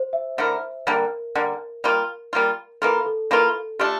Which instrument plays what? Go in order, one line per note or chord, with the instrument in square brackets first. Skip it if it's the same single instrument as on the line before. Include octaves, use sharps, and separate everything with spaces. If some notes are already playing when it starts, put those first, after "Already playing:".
Already playing: [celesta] C5
E5
[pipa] D3 A3 E4 A#4 [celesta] E5
[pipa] D3 G3 A#3 [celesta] A#4
[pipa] D3 G3 A#3
G3 A#3 F4
G3 A#3 F4
[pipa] E3 A#3 F4 [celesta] A4
[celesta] A4
[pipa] E3 A#3 F4
[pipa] A3 D4 F4 [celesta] G4